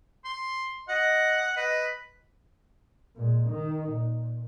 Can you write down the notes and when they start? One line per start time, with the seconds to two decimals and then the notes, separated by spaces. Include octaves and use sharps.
0.24 C6
0.89 D#5 F#5
1.57 B4 D#5
3.16 A#2 G#3
3.49 D#3 D#4
3.92 A#2